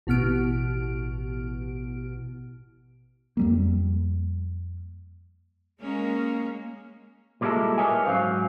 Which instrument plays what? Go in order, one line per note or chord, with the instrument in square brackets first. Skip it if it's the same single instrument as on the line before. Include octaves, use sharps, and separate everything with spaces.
[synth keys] A1 B2 B3 F6 D7
[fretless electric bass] F2 G3 A#3
[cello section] G#3 A#3 C#4
[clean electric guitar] A#2 G3 G#3 C4 E4 A4
A#4 B4 C#5 D#5 E5 G#5
G#2 F#3 C#4 G4 C5 F5